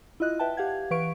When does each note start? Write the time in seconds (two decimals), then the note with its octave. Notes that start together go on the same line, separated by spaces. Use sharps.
0.20 E4 F4 D#5 F#6
0.39 B4 E5 G5 A5
0.57 G4 F5 F#5 G#6
0.91 E3 B4 F5 C#6 D7